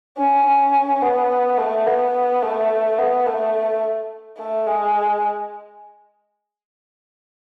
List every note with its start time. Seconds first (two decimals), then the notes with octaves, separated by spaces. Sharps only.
0.18 C#4
0.46 C#4
1.02 B3
1.58 A3
1.86 B3
2.43 A3
2.98 B3
3.27 A3
4.38 A3
4.66 G#3